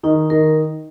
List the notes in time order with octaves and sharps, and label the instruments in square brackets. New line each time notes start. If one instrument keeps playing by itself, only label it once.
[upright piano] D#3 [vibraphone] D#4
[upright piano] D#3 [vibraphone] A#4